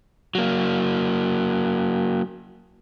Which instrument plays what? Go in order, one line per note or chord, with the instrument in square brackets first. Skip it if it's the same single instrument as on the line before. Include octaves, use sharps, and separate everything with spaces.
[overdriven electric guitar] F#3 A#3